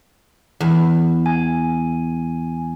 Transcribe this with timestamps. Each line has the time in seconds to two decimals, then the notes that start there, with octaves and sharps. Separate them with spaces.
0.60 E2
1.26 G#5